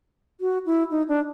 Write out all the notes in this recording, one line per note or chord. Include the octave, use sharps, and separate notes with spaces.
F#4
E4
D#4
D4